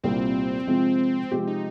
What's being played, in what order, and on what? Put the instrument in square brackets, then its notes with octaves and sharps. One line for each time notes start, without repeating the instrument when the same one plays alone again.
[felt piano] C2 A#2 G3 A#3 [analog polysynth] C4
[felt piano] C3 F3 G#3 C4
C3 F3 G#3 C4 G4
[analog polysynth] D#4